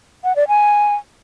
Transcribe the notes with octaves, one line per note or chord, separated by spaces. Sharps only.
F#5
D5
G#5